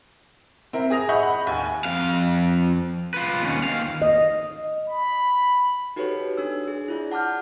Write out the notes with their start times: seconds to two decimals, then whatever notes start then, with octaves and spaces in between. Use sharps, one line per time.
0.73 C4 E4 A#4
0.90 G#4 D#6 A#6 F7
1.09 D#5 E5 F#5 B5 C#6 G6
1.20 F#5 B5
1.47 D#2 G#5
1.85 F2 F5
3.14 F4 B4
3.42 D#2 C#4
3.64 D#2 F5
4.02 D#5
4.90 B5
5.96 D#4 F#4 G4 A4 B4 C#5
6.38 D4 C#5 E6
6.68 G#4
6.88 E4 F4 D5
7.12 F#5 A5 D6 F6 G6